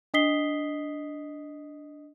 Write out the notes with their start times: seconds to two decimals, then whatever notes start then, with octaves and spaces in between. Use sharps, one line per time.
0.14 D4 D#5 D#6 B6 C7 G7